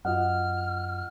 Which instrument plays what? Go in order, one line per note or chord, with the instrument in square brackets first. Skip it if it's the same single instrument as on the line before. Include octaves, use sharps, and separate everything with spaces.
[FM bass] F#2 [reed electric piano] F4 D#5 F#5 [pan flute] F6